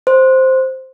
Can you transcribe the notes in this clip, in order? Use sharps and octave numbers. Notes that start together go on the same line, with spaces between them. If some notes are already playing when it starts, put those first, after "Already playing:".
C5